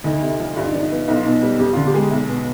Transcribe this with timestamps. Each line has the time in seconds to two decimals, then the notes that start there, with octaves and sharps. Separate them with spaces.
0.04 D2 D#4
0.22 C3
0.39 F3
0.56 G2 F4
0.64 D#4
0.72 F3 D4
0.80 D#4
0.91 B3
1.08 B1 D#4
1.16 F4
1.24 B2 D#4
1.42 G3
1.59 F2 G4
1.73 D3 F4
1.87 G4
1.94 G#3
2.11 B1
2.28 B2